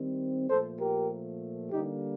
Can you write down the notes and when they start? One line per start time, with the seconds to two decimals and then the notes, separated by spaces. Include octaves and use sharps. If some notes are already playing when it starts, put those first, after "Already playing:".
Already playing: D#3 G3 C4
0.49 A#2 F3 A3 A4 C5
0.79 G4 A#4
1.71 D3 G3 A#3 D#4 G4